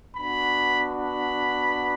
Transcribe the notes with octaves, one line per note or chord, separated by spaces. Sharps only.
B3 D4 F#4 B5
B5